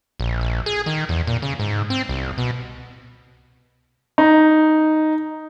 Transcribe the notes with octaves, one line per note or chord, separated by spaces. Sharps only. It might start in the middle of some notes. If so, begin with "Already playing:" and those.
A#1
A#1
G#4
D#3
E2
A#2
C#3
G#2
C4
C2
B2
D#4